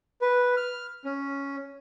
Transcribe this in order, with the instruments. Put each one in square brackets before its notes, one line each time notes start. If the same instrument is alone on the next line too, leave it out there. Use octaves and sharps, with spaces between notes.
[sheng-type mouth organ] B4
F6
C#4